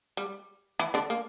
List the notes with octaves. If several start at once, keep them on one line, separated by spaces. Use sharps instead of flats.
G3
E3 E4
D3 D4
A#3